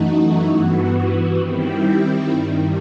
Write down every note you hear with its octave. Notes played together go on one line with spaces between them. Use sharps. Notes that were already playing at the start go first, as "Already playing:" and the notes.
Already playing: F#2 E3 A3 D#4 F#4
G2 E3 B3 F#4
D#3 G3 C4 E4 G4
G2 D#3 G3